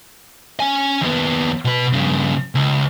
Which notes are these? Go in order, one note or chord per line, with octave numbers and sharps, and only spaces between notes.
C#4 G#5
D#2 B3
B2 B4
G2 C#3
C#2